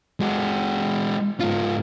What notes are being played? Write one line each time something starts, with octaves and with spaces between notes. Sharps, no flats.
G#3 F#4
G#2 F4